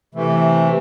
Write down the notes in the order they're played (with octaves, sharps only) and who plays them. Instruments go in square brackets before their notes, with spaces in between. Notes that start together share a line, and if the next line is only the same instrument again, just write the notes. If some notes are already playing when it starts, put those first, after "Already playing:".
[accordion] C3 E3 A3